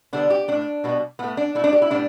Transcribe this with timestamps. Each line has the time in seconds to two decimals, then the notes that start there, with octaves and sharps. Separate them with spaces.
0.13 D3 G3 B3 D4
0.30 G4
0.48 A2 A3 D4
0.84 B2 G3 B3
1.19 A2 A3 B3
1.37 D4
1.55 B2 A3 E4
1.64 D4
1.73 G4
1.82 E4
1.90 A2 G3 B3 D4